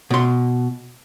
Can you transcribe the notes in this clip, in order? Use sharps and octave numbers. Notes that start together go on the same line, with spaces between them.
B2 C6